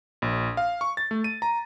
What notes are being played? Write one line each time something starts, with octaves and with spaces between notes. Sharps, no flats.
A#1
F5
C#6
A6
A3
D#7
A#5